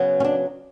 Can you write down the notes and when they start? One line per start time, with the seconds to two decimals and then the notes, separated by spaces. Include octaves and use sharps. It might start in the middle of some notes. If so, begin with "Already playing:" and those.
Already playing: C#3 F#3 B3
0.20 C#4
0.24 D4